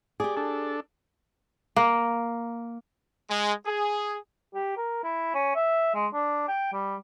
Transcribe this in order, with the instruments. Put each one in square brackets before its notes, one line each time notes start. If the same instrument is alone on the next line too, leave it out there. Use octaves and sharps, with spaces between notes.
[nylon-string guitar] G4 G#4 [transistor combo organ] D5
[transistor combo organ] D4 A4
[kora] A#3
[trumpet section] G#3
G#4
[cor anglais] G4
A#4
E4
C#4
E5
G#3
D4
G5
G3